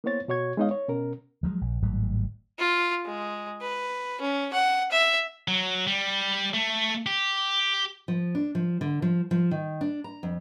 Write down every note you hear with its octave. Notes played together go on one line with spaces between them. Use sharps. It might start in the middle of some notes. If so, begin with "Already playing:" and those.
A#3 B3 E4 C5 C#5 A6
B2 F#4 C#5 C#6 G#6
G#3 B3 D#4 C#5 D#5 F5
C#5
B2 C#4 A#4
F3 F#3 G#3
A#1
G#1 A2 F#3 G3
F4
G#3
B4
C#4
F#5
E5
F#3
G3
A3
G4
F3
D4
F3
D3
F3
F3
D#3
D4
A#5
F2